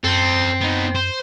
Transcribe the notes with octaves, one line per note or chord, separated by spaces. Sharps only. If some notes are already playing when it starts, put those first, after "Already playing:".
F#2 C4 A4 C5
B3 D#4
C5